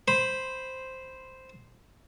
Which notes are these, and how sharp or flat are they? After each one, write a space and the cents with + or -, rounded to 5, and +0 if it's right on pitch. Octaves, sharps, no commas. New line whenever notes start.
C5 +0 B5 +0